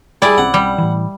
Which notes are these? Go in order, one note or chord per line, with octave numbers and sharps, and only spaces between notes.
G3 E4 G#4 D5
B1 C4 C#4 F#5
G3
A2 E3